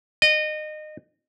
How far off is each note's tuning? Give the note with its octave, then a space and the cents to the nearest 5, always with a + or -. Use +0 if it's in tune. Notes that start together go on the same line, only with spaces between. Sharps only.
D#5 -25